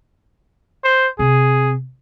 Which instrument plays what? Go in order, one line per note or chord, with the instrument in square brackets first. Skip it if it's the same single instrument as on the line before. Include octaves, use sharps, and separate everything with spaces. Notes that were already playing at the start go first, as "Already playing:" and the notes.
[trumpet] C5
[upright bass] C3 [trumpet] G#4